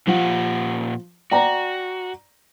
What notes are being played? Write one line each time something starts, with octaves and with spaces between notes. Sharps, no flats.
A#2 F3 G4 F#5
F#4 D5 G5 A#5